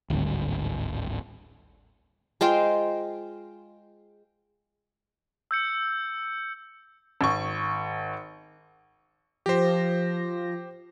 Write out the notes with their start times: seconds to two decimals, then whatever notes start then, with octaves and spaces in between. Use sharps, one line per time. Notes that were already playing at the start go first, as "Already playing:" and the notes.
0.10 D1 G#1 D2 G3
2.41 G#3 F4 C5 G5
5.51 E6 G6 C#7
7.21 G#1 C#6
9.46 F3 G4 C5 A#6